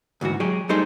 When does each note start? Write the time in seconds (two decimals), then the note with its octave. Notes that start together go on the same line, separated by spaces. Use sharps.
0.21 D2 G#2 E3 F#4
0.40 F#3 G#3 G4 G#4
0.69 G3 A3 D#4 G#4 C5